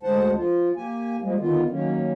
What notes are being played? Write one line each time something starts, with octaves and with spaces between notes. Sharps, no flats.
D2 D3 G#3 C5 F#5 A5
F3 F4
A#3 G4 G#5
F3 G3 G#3 A#3
D3 D#3 B3 F4
D#3 F#3 A#3 C#4